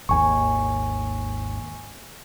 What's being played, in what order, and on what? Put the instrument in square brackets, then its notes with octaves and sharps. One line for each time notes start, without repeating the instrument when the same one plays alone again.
[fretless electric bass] G#1 D#2 [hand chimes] G#5 C#6